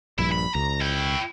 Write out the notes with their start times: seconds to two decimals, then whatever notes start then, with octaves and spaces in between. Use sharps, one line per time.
0.19 A#1 G2 E4
0.32 B5
0.55 C#2 A#5
0.81 E4 G5